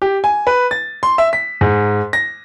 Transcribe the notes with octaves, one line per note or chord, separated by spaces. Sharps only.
G4
G#5
B4
A6
C6
E5
B6
G#2
A#6